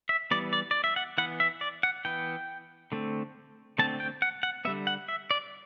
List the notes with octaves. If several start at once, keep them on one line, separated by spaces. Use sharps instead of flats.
E5
E3 G3 B3 D5
D5
D5
E5
F#5
E3 B3 F#5
E5
D5
F#5
E3 B3 G5
D3 A3 C4
D3 A3 C4 A5
G5
F#5
F#5
D3 G3 B3 E5
F#5
E5
D5